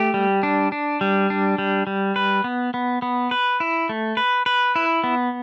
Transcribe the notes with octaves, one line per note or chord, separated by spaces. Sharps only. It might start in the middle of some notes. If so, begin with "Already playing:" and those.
Already playing: A3 G4
G3
D4
D4
G3
D4
G3
G3
B4
B3
B3
B3
B4
E4
A3
B4
B4
E4
B3